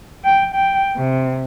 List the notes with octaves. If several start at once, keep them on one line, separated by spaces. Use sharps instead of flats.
G5
G5
C3